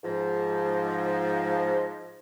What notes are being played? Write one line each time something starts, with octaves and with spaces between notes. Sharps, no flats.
G#2 F3